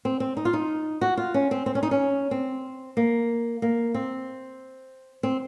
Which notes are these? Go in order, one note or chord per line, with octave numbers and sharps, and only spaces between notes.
C4
C4
D#4
F4
D#4
F#4
F4
C#4
C4
C4
C#4
D#4
C#4
C4
A#3
A#3
C4
C4